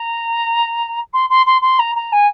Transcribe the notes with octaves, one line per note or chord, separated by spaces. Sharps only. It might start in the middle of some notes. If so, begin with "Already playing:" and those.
Already playing: A#5
C6
C6
C6
C6
A#5
A#5
G#5